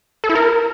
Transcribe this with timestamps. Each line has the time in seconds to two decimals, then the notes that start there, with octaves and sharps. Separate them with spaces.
0.24 A4
0.29 E4
0.35 A#4